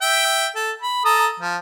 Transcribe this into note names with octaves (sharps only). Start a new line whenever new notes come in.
E5 G5
A4
B5
A4 A#5 D#6
F3